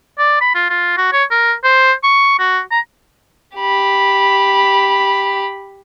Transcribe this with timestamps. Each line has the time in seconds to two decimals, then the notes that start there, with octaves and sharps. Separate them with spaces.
0.18 D5
0.41 B5
0.55 F4
0.70 F4
0.98 F#4
1.12 C#5
1.31 A#4
1.64 C5
2.03 C#6
2.39 F#4
2.71 A#5
3.57 G4 B5